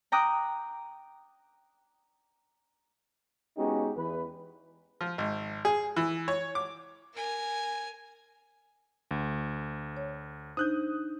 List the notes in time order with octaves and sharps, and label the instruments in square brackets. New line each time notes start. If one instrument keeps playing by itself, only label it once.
[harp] G5 A#5 D6 D#6 F#6
[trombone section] G#3 B3 C#4 D#4 F#4 G4
E2 B4
[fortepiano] F3
G#1
G#4
E3
C#5
D6
[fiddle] A#4 G#5
[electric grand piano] D2
[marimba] C#5
[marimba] D4 D#4 C5 [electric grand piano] D#6 F#6 G6